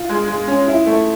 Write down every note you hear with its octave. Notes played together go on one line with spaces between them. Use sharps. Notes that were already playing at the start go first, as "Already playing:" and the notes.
Already playing: F4
G#3
G#3
C#4
E4
A3